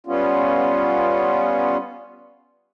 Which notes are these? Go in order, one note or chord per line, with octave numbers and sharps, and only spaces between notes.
G3 B3 C#4 F4